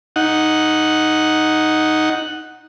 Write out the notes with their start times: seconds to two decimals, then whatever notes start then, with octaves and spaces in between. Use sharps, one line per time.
0.16 D#4 F#5